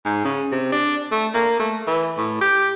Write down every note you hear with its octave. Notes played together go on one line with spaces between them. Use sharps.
G#2
C#3
C3
D4
A3
A#3
A3
E3
A2
G4